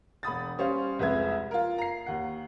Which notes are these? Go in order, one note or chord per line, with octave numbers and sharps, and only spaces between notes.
E1 B5 D#6 A6
G3 C#4 C5 F5
C2 F2 G#3 B4 E5 G#6
F4 A#4
A#5 C7
D#2 F#5